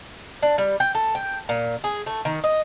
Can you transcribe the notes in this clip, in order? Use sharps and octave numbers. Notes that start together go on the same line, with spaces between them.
D4
G3
G5
A4
G5
A#2
G#4
A3
D#3
D#5